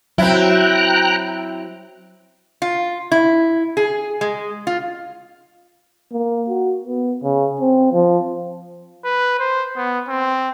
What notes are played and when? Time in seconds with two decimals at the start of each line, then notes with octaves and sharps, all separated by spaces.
0.18 F#3 C4 E4 G5 A#5 F#6
2.62 F4
3.12 E4
3.77 G#4
4.21 G#3
4.67 F4
6.12 A#3
6.49 F#4
6.85 B3
7.23 C#3
7.60 C4
7.93 F3
9.05 B4
9.39 C5
9.76 B3
10.08 C4